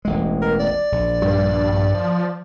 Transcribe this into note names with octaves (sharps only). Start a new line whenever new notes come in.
E1 A1 G#3
A#4
D5
A#1
G2
F3